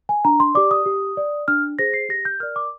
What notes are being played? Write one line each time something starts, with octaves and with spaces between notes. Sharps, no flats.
G#5
D4 A#5
C6
G4 D5 D6
D#6
G4
D5
D4 F6
G#4 C5 A#6
C7
G4 A#6
G6
A#4 D5 F6
D6